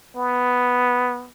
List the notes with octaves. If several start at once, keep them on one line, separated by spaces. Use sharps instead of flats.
B3